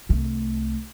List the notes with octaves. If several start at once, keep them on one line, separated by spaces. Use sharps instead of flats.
C2 A3